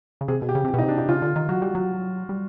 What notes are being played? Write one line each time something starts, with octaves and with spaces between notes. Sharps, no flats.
C#3
C3 G#4
B2
G4
C#3
C3 G4
B2
D#4
C3
D4
D#4
C#3 F4
D3
D#3
F#3 F#4
G3
F#3
G3